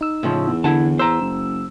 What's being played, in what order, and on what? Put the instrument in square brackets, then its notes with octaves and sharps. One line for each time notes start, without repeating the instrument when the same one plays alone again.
[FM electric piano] D#4 E6
[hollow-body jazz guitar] A2 C#3 F3
[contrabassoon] E2
[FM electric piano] D3 [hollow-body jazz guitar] E4 F#5 A5
[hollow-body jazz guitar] C5 A#5 [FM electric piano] E6
[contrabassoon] F#1